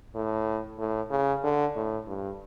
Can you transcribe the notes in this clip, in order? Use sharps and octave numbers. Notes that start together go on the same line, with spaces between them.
A2
A2
C#3
D3
A2
G2